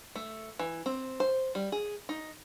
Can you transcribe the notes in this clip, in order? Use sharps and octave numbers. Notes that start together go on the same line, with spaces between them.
A3
E3
C4
C5
G3
G#4
D#4